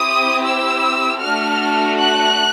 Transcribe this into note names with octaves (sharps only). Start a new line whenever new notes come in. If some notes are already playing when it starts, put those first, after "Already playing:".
Already playing: C4 E4 G4 D#6
E6
A3 D4 F#4 A4 F6
F#6